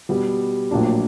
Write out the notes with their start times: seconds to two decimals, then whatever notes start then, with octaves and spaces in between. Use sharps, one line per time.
0.09 B2 G3 B3
0.71 A#1 A2 F#3 A#3 D4